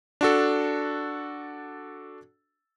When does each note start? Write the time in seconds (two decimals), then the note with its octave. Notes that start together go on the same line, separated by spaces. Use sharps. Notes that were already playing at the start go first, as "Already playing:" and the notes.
0.21 D4 F#4 A4